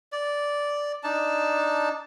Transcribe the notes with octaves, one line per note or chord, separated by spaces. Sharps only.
D5
D4 D#4 A5